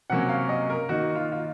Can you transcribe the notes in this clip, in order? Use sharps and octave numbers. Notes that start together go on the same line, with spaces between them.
C3 F#3 A#3 C#4 F#5
F5
D#5
A#4
D#3 A#3 D#4 F#4
F4
F4